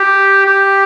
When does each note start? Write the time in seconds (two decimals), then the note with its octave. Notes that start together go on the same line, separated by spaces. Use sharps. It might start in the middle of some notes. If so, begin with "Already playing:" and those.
Already playing: G4
0.46 G4